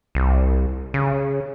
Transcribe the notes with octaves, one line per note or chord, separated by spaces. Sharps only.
C2
C#3